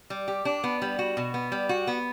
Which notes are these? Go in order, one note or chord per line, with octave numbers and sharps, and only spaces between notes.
G3
G4
D4
B3
G3
F#4
B2
B3
G3
F#4
B3